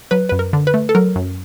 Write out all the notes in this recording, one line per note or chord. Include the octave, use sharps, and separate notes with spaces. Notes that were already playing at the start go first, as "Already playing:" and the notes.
F#3 B4
F#2 B4
A#4
D3
B4
A3
A4
F#3 A#4
F#2